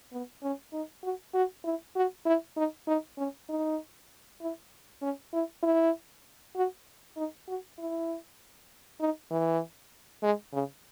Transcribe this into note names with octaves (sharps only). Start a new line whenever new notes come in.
B3
C#4
D#4
F#4
F#4
E4
F#4
E4
D#4
D#4
C#4
D#4
E4
C#4
E4
E4
F#4
D#4
F#4
E4
D#4
E3
G#3
C#3